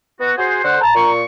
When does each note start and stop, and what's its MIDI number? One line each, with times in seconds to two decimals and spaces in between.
0.20 0.32 59
0.20 0.32 66
0.37 0.59 66
0.37 0.59 68
0.37 0.59 72
0.63 0.80 50
0.63 0.80 72
0.63 0.80 78
0.81 0.92 81
0.81 1.10 82
0.95 1.24 46
0.95 1.24 85